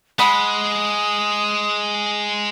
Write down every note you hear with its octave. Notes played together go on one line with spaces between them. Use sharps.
G#3 F#5 B5 D#6